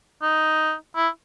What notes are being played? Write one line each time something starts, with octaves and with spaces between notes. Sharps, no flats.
D#4
E4